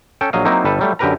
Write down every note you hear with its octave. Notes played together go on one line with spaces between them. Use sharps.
C#4 A4 G5
A#1 F#3 D#5 F5
F#3 A#3 C4 D#4 E4
G1 G3 A4 B4
F#3 G3 A3
F#2 D3 G4 A#4 B4 A#5